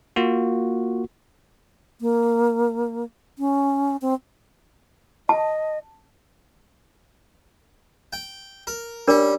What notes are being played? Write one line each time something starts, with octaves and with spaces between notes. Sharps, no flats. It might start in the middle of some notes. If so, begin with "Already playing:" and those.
A#3 F4 F#4
A#3
C#4
C4
D#5 A5
G5
A#4
G3 C#4 D4 A#4